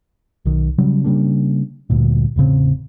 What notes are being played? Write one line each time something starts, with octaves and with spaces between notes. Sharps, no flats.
B1 D#3
C#3 F#3 G3
C#3 G3 A#3 D4
D2 G2 A#2
E1 A2 C#3 C4